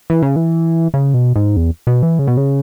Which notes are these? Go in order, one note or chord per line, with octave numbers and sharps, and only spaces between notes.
E3
C#3
E3
C#3
B2
G#2
E2
B2
E3
C#3
B2
C#3